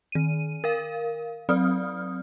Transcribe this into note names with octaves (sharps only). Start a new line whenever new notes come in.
D#3 D#7
A#4 F5
F#3 C4 D5 D#6 F6